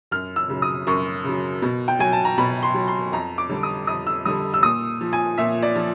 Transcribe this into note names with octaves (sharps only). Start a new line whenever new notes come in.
F#2 F6
E6
C#3 F#3
D#6
F#2 C#6
C#3 F#3
B2
G5
F#3 G#5
A5
A#5
B2 B5
C6
F#3
C6
F2 A#5
D6
D3 G3
D#6
F2 D#6
E6
D3 G3 D#6
E6
A#2 D#6
F3
G#5
A#2 E5
D5
F3